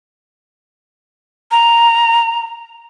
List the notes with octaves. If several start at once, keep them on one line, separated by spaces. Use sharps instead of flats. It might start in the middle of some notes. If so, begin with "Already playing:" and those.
A#5